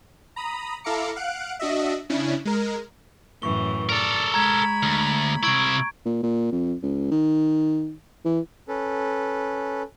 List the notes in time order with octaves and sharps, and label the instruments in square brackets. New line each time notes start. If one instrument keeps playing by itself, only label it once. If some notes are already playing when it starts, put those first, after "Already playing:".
[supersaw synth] A#5 B5 D#6
E4 A4 F5 A#5 D6 C#7
F5 F#5 F#6 D7
D4 F#4 D#5 E5
C#3 C#4 D4 E4
G#3 A#4
[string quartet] F#2 A2 E3 [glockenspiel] C#6 G7
[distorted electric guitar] A4 A#4 [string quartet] D5
[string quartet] G#3 B5 [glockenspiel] A#5 G#6
[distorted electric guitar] D2
[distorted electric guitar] C3 E4 [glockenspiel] C#6 G#6 D7
[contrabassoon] A#2
A#2
F2
C#2
D#3
E3
[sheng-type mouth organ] C#4 A4 B4